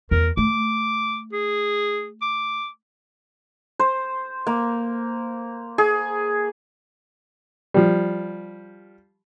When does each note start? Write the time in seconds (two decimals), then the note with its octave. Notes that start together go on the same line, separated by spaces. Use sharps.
0.11 E2 A#4
0.37 A3 D6
1.33 G#4
2.22 D6
3.79 C5
4.47 A#3
5.78 G#4
7.74 F3 G3